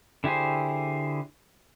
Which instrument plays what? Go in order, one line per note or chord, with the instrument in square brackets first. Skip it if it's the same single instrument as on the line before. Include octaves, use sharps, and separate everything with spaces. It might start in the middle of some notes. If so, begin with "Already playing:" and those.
[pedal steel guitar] D3 E4 G4 G#4 C5